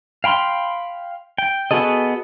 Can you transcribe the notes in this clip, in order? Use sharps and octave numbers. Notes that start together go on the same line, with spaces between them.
F5 G5 B5 C6
G5
B3 F#4 G#4 A4 D#5